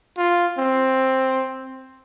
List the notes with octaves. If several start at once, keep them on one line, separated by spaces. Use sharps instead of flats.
F4
C4